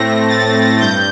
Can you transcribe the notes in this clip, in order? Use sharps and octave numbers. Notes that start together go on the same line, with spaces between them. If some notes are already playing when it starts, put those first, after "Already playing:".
Already playing: A2 A3 C4 A#6
A6
G2 G6